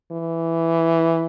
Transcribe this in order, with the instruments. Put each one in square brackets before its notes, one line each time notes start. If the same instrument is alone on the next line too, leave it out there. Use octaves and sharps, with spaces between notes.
[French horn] E3